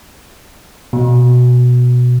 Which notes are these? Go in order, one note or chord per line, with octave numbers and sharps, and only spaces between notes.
B2